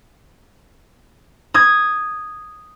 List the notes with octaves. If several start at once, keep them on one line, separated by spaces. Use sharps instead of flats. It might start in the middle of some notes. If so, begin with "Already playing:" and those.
D#6 G#6